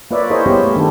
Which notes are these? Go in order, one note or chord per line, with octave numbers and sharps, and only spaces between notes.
A#3 F4 B4 C#5 D5 E5
E4 G#4 A#4 C5 C#5 D#5
G3 B3 C#4 E4 G4 C5
A3
D#3 D4 G4 A4